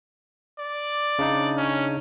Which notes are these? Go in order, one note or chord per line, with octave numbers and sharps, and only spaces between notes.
D5
C#3 D4 D#4
C#4